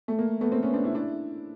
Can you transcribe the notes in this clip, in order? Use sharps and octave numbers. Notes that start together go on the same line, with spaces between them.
A3
A#3
A3 B3
A#3 C4
B3 C#4
C4 D4
D4 E4
D4 E4